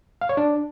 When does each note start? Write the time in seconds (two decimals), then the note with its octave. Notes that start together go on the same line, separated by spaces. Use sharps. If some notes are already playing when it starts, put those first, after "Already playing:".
0.21 F5
0.29 C#5
0.37 D4